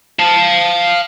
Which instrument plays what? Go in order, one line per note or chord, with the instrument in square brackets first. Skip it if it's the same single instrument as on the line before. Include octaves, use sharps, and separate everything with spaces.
[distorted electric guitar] F5 A5